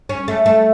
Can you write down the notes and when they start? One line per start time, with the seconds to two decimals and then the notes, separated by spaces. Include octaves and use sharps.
0.09 C#4
0.28 A3
0.46 A3